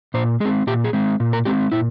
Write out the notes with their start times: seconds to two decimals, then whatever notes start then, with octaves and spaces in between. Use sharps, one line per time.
0.14 A#2 C5
0.40 G#3 G#4
0.45 C4
0.67 A#2 G4
0.84 G#4
0.93 G#3 C4
1.20 A#2
1.33 A#4
1.45 G#3 C4 G4
1.72 A#2 E4